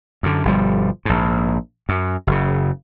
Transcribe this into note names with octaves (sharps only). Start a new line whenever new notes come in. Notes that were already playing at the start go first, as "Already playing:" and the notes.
F#2 D3
G1 B2 F3 G3
A#1 G#2
F#2
F#1 C#3